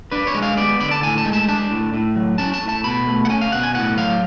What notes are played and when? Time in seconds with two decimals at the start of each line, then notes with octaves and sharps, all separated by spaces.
0.11 D4 B4
0.27 C#5
0.34 G#3
0.43 F5
0.57 B3 D5
0.80 D3 D5
0.91 A5
1.03 A2 G#5
1.18 A5
1.26 G#3
1.33 A5
1.48 D4 A5
1.71 A2
1.94 A2
2.16 F#3
2.38 C#4 A5
2.54 A5
2.62 A2
2.69 A5
2.84 B2 B5
3.07 A3
3.25 F#5
3.30 C#4 G#5
3.41 F5
3.52 B2 F#5
3.63 G#5
3.75 A2 F#5
3.97 F#3 F5